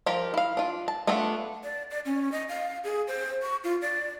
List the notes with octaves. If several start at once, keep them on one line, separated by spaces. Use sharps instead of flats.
F3 F4 G4 A#4
E4 F5
D4 F4
A5
A3 B3 D4 F4 A4
D5
D5
C#4
D#5
F5
G#4
C5
C#6
F4
D5